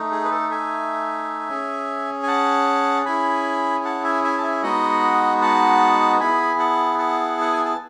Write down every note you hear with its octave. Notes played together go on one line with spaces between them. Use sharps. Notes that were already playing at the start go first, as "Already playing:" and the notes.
Already playing: A3 D#4
G#4
B4
A4
E5 G#5
C#4 G#4
G#5
F#5 A5
C#4 E4 G#4 G#5 B5
F#5 A5
E5 G#5
E5 G#5
A5
E5 G#5
G#3 B3 D#4 F#4 D#5 F#5
F#5 A5
B3 E4 G#4 G#5 B5
F#5 A5
F#5 A5
F#5
G#5
A5